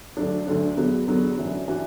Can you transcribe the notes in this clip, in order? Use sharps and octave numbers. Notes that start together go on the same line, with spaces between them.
D2 D3 F#3 D4
D2 D3 F#3 D4
E2 D3 F#3 B3 F#4
E2 D3 F#3 B3 F#4
F#2 E3 D4 F#4
E3 D4 F#4